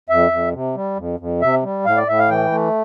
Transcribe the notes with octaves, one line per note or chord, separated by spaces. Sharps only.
F2 E5
F2
C3
G3
F2
F2
C3 E5
G3
A2 F5
D5
A2 E5
F5
E3 G5
A3